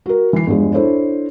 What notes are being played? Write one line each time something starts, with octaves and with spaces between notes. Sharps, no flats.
F#4 A#4
E3 C7
E2 G2 F3 G#3
D4 E4 A4 C5 C#5